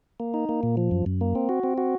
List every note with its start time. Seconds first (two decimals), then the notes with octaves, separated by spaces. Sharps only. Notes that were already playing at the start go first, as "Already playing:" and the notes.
0.20 A#3
0.34 D#4
0.49 A#3
0.63 A#2
0.77 F3
0.91 F#2
1.06 F#2
1.21 A#3
1.35 C4
1.49 F#4
1.63 C4
1.78 F#4